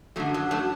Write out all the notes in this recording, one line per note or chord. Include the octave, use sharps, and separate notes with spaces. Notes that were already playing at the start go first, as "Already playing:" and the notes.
F#2 D3 F#3 A3
F#3
F#3 A3